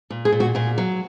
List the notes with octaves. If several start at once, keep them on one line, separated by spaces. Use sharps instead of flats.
A#2
G#4
A#2
F#4
A#2 G#4
F#3